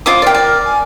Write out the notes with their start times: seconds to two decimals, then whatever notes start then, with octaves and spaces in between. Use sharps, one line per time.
0.06 F4 C5 D6 D#6
0.22 A#4 D5 G5
0.35 D5
0.65 G#5